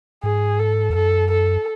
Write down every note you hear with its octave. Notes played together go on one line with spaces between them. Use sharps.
G#2 G#4
A4
E2
F#2 A4
A4